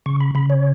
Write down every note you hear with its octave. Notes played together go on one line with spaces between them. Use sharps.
C#3 C#6
B5
C#3 B5
C#5